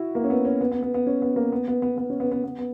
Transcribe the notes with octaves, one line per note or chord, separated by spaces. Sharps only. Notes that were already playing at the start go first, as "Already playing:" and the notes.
Already playing: E4 F#4
A#3
C#4
B3
C#4
B3
B3
B3
B3
C#4
B3
A#3
B3
B3
B3
B3
C#4
B3
B3
B3
B3